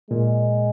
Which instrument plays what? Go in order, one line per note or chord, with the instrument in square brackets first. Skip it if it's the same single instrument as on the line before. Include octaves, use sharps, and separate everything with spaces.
[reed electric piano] A#2 [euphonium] G#3